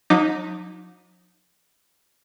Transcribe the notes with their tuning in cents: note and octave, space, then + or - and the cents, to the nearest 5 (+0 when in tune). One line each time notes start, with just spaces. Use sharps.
F#3 -45 D#4 +0 D6 +0